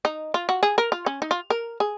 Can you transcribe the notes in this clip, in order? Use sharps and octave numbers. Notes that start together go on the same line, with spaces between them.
D#4
F4
F#4
G#4
A#4
F4
C#4
D#4
F4
A#4
G#4